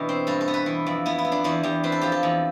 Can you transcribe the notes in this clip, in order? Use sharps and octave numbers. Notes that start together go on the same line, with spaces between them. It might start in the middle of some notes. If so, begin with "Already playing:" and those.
Already playing: B2 E3 D4 G4
C4
G2 A4
A4
B3
B4
E3
F2
B3 E4
E4
B3
D4
E2 E4
E2 G4
C4 B4
A4
F3 G4
A4
E2